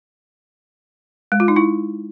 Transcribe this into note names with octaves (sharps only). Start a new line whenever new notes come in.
G#3
F4
D#4
E4